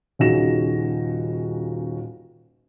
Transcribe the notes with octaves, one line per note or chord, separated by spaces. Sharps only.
D#1 C#3 D#4 F#4 A#6 E7